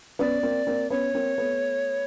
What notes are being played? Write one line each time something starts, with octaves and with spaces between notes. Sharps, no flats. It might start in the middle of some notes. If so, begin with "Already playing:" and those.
B3 C#4 D5
A#3 C4
A#3 C4
B3 C#4 C#5
A#3 C4
A3 B3